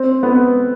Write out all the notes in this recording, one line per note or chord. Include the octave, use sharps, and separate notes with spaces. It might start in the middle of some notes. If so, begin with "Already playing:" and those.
Already playing: C4
B3